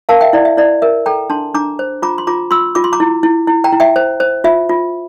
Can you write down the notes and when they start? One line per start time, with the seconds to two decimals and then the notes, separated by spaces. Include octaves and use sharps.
0.09 A#4 F5 A5
0.21 E5 G5
0.33 E4 D5
0.45 E5
0.57 E4 D5
0.82 A#4 E5
1.06 A4 G5 A#5
1.30 D4 A5 C6
1.54 D4 A#5 D6
1.79 C5
2.02 F4 A#5 D6
2.18 C6
2.27 F4 A#5 D6
2.51 F4 C6 E6
2.75 F4 D6
2.84 C6
2.93 A#5 D6
3.00 E4
3.23 E4
3.47 E4
3.64 G5 A#5
3.72 E4
3.80 E5 G5
3.96 C5
4.20 C5
4.44 F4 E5
4.69 F4